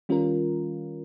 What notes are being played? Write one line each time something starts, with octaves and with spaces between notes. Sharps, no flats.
D#3 G3 C#4 F4 A#4